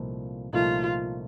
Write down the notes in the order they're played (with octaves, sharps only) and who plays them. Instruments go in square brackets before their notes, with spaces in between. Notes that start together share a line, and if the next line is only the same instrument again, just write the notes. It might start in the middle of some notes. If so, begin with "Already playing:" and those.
Already playing: [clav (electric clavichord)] C2 A#2 F3 A3 D#4
[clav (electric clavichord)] C2 A#2 F3 A3 D#4 [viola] F4